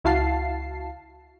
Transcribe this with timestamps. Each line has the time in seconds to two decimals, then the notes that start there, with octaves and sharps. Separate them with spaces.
0.04 C#2 E4 F#4 F5 A5 C7